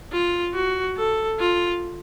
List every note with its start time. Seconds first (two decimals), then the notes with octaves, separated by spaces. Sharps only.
0.12 F4
0.54 F#4
0.97 A4
1.39 F4